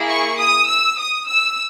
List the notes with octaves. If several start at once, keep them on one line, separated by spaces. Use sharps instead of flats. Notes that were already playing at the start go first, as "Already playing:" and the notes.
Already playing: A#3 E4 G#4
C#6
D#6
E6
D#6
E6